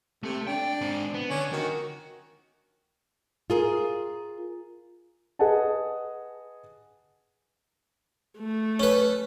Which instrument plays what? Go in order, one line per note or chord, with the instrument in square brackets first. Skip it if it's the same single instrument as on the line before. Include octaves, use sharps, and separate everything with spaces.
[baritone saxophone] C3 [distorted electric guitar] A3 A4
[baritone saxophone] D4 [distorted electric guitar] G5
[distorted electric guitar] G#2 C4
B3
[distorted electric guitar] D3 [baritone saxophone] C#4
[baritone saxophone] D#3 [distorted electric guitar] F#4
[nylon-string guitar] F4 G#4 A#4
[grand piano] G#4 B4 D#5 F#5 G#5 A5
[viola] A3
[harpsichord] C#4 B4